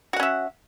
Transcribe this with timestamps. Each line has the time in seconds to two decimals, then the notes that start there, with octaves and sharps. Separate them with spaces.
0.13 F#4
0.16 F#5
0.20 C#4
0.23 E5